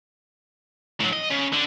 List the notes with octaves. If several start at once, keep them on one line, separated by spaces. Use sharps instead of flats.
A2 F#3
D#5
C#3
D3